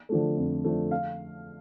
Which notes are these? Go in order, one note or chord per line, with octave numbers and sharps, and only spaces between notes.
D3 F3 A3
F2
D3 F3 A3
F5